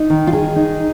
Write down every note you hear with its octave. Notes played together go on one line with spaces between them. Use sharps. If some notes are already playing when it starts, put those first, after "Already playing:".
Already playing: D#4
D#3
F4
D#3 G#4
D#4